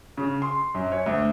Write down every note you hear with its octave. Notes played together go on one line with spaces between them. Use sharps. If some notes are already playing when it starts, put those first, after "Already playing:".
C#3
C6
F#2
C#5
D2